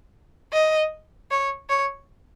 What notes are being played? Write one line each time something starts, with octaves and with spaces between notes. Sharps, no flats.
D#5
C#5
C#5